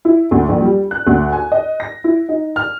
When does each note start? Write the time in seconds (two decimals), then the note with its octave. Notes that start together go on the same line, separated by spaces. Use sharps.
0.05 E4
0.31 D2
0.49 A#1
0.62 G3
0.91 F#6
1.07 D2
1.33 G#5
1.52 D#5
1.80 A#6
2.04 E4
2.29 D#4
2.56 F6